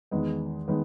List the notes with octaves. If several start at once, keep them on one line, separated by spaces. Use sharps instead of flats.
E2 D#3 G#3 B3
D#3 G#3 B3